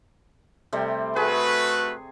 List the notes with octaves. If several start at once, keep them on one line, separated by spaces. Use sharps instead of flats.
C3 G3 A3
A3 F#4 G#4 B4